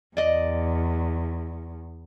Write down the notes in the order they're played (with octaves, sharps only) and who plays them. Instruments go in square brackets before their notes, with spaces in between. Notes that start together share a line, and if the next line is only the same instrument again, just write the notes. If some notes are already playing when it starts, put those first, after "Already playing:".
[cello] E2 [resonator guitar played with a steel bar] D5 D#5